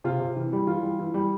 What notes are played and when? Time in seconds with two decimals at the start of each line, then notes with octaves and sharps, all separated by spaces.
0.04 C3 F4
0.20 C3
0.36 E3
0.53 G3
0.67 E3 F4
0.83 G3
0.99 E3
1.14 G3